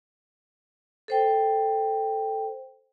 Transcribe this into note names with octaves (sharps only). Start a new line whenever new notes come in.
A4 C5 G5